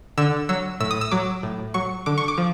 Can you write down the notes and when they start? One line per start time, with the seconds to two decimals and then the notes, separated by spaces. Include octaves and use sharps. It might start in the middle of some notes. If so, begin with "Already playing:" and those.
0.18 D3 E6
0.49 F#3 E6
0.80 A2 E6
0.91 D#6
1.01 E6
1.11 F#3 D6
1.43 A2
1.74 F#3 C#6
2.06 D3 D6
2.18 C#6
2.28 D6
2.38 F3